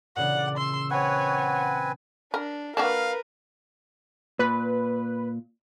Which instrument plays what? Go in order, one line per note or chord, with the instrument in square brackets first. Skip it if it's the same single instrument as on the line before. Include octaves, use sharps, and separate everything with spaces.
[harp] A#2 C#3 E3 [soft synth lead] D5 [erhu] F#5
[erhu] C6 [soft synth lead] E6
[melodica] C4 B4 G#5 [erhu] C#5 [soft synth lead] F#5
[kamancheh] D4 [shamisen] A#4
[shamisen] A#3 D4 F#4 [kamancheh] A#4 B4 [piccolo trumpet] F5
[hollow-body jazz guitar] A#2 [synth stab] B4